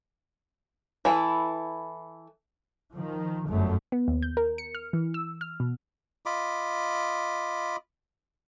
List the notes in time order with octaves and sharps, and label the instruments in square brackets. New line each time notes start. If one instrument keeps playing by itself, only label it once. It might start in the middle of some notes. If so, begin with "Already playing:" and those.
[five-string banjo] E3 E4 A4
[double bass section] D#3 F3
G1 F#2 A3
[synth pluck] B3
D#2
G6
A#4
C#7
F6
E3
E6
F6
B2
[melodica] F4 D#5 B5 D6